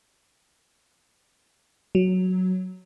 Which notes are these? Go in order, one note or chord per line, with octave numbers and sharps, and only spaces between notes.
F#3